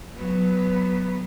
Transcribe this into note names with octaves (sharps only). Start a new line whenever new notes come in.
F#3 B3